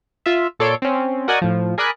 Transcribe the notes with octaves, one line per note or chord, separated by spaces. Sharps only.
F4 E5
A#2 A4 C#5 D5 C6 D7
C4 C#4
F#4 A#4 D5 D#5 F#5 G#5
A2 F3
G#4 A#4 D5 G#5 B5 F#6